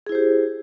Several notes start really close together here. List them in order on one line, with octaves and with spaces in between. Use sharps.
G#4 E4 C5 G4